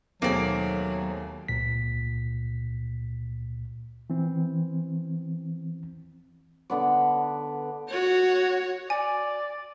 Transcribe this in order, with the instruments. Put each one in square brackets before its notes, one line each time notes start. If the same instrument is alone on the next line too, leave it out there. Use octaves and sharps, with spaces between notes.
[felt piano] D#2 A3 [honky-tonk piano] B2 C4 G#4 [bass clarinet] F#3 [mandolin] A#3 D5
[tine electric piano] C#2 A#2 B6
[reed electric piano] E3 C4
[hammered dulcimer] D3 B3 D5
[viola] F#4 C#5
[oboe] D5 [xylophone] G#5